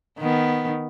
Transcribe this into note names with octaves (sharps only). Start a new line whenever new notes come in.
D#3 B3